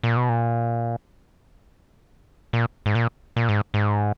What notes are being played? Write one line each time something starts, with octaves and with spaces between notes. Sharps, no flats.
A#2
B2
A#2
A#2
G#2
A#2
A#2
G#2
G#2